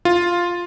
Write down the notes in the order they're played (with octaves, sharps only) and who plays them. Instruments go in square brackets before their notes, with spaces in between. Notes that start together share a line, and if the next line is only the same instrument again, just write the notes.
[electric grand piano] F4